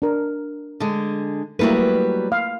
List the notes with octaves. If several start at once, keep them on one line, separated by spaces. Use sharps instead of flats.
D4 A#4
D3 G#3
F#3 G3 A3 A#3 E4 B4
F5